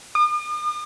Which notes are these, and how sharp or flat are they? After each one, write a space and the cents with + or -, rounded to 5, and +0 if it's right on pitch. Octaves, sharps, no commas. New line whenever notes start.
D#6 -45